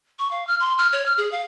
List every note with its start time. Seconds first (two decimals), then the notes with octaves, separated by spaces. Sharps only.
0.19 C#6
0.31 F5
0.47 F6
0.60 C6
0.78 F6
0.93 C#5
1.06 F6
1.18 G#4
1.32 F5